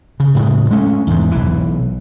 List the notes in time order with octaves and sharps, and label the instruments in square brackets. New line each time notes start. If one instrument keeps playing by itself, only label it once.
[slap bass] C#3
A2 C#3 G#3
G#3 A3 C#4
E2 G#2
B1 E3